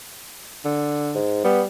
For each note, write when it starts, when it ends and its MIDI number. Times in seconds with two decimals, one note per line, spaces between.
0.65 1.17 50
1.15 1.41 44
1.44 1.67 55
1.44 1.62 59